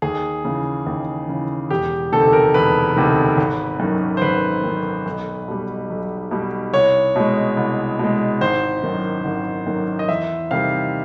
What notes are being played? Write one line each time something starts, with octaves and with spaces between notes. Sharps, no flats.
D#2 G#4
C#3 E3
D#2
C#3 E3
E1 G4
D2 C3 D#3 A4
A#4
E1 B4
D2 C3 D#3
G#1
F#2 D#3
C5
G#1 B4
F#2 D#3
B1
B2 G3
B1
B2 G3
C2 C#5
B2 G#3
C2
B2 G#3
G#1 C5
F#2 D#3
G#1
F#2 D#3
D#5
E2 E5
C3 D#3 G3 F5